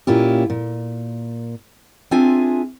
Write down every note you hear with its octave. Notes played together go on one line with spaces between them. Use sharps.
A#2 A#3 C#4 E4 F4 G4
A#2
C4 D4 F4 G#4 E5 G#5